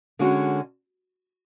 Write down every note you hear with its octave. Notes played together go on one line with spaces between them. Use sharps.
D3 G#3 C#4 F#4